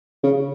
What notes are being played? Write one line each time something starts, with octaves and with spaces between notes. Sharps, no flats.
C#3